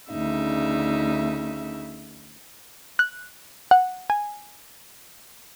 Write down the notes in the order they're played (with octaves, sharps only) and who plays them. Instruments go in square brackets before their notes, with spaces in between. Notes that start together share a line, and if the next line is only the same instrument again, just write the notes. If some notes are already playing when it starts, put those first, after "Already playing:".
[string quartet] D2 C#3 D#4 E5
[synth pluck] F#6
F#5
G#5